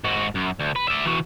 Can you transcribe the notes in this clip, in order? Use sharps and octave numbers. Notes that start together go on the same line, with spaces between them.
G#2 F#4
F#2
D2
B4
D5 E5
E3 F#4